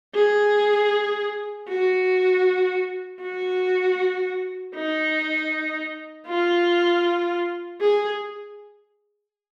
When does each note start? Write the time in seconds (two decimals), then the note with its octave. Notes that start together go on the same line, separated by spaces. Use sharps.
0.15 G#4
1.69 F#4
3.22 F#4
4.75 D#4
6.27 F4
7.81 G#4